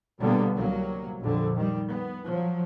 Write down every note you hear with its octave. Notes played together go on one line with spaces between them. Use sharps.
B2 D3 F#3 G3 A#3 B3
C2 F#3 A#3
A#1 F2 D3
D#3 G3
B3
F3 F#3